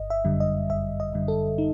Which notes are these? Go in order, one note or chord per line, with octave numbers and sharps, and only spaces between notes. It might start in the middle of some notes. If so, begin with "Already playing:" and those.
Already playing: G1 D#5
E5
F#2 D3 G3
D#5
G1 E5
D#5
F#2 D3 G3
A4
D#4